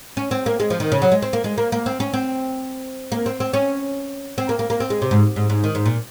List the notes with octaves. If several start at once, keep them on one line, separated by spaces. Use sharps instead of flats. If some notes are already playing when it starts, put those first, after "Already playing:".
C#4
C4
A#3
G#3
F3
D#3
C#3
F#3
G#3
C4
A#3
G#3
A#3
A#3
C4
C#4
C4
A#3
C4
C4
C#4
C4
A#3
A#3
A#3
C4
G#3
C3
G#2
G#2
G#2
D#3
G#2
A#2